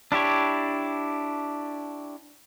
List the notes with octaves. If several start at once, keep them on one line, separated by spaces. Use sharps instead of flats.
D4 E4 G4 C#5